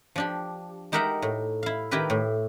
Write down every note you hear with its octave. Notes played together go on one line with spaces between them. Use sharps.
F3 D4 G4
G#3 D#4 G4 A#4 E5 F#5
A2
E4 F5
D#3 E4 F4 G4 A#4 B4
A2